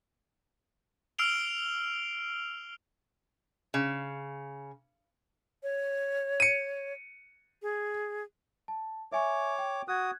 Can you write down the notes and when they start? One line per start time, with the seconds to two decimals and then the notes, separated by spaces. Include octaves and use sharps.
1.18 E6 F6 C7 D7 F7 G7
3.74 C#3
5.63 C#5
6.40 C#7 D#7
7.62 G#4
8.68 A5
9.12 C#5 E5 G#5 C#6 D6
9.58 G5
9.88 F#4 D#6 F#6 G#6